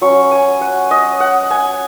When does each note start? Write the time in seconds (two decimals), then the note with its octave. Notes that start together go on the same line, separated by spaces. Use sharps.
0.01 F#3 C#4 C#6
0.31 G#5
0.61 F#5
0.91 D#5
1.20 F#5
1.50 G#5